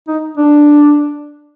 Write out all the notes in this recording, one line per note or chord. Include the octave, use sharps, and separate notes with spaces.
D#4
D4